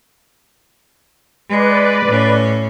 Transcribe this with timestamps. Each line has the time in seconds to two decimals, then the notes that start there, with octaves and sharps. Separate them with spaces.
1.50 G#3 B4 D5
2.06 A2 C#4